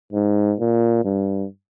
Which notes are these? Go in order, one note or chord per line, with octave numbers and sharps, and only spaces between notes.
G#2
A#2
G2